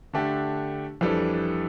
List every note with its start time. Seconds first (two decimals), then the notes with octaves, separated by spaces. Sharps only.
0.13 D3 A3 D4 G4
1.01 F2 E3 G3 D4 A4